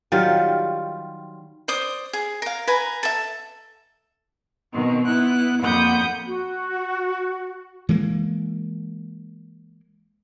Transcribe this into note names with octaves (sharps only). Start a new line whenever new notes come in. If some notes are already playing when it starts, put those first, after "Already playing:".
D#3 F#3 G3 F4
C5 D5 D#6
G#4
A#4 F5
B4 G#5 A#5
A4 E5
B2 D#3 C4
B3 E4 F#6
F2 A#3 F#5 B5 D#6 G6
F#4
E3 G#3 A#3